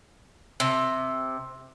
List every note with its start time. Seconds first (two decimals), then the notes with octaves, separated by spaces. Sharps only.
0.60 C3